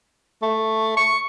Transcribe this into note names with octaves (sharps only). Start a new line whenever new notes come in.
A3
C#6